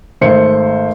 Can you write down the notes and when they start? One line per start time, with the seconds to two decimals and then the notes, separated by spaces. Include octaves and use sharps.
0.21 G#1 A3 C5 C6 C#7